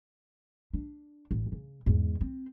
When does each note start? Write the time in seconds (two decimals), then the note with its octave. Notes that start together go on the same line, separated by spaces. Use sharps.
0.74 D4
1.31 A1
1.52 C#3
1.86 E2 G#2
2.21 C4